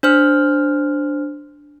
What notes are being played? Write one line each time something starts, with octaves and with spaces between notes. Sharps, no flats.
D4 C5 F6